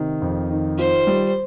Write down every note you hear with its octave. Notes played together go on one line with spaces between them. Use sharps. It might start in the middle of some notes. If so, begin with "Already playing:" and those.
Already playing: C3 D#3
F2
D#3
F4 C5
G3